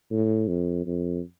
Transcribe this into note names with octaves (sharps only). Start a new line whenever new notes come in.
A2
F2
F2